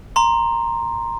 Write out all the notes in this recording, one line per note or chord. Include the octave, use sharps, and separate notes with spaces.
A#5 C6